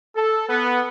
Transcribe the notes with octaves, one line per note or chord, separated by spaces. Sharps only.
A4
B3